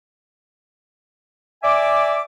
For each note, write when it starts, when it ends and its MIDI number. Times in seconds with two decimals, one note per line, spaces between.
1.63 2.21 74
1.63 2.21 76
1.63 2.21 80
1.63 2.21 86